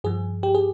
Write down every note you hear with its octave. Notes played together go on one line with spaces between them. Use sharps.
G2 F3 G#4
G4
G#4